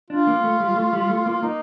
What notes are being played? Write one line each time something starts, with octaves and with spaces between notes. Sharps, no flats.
D4 F4
A#3
A3
G3
G3
A3
G3
A3
A#3
A#3 D#4